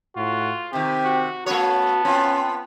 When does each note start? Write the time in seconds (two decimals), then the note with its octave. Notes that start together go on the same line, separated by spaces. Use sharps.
0.16 A2 F4 F#4
0.73 C3 D#3 C4 G4
1.05 F#4
1.46 A3 B3 C#4 F#4 C#5 A5
2.05 C4 C#4 F4